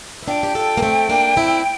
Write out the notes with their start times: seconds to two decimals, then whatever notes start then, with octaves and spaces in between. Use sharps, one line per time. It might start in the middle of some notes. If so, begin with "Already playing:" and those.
0.23 E4
0.28 D4 F4 G5
0.43 G4
0.55 F4 A4
0.77 A#3
0.83 A3 C4
1.09 A#3 D4
1.36 C4 E4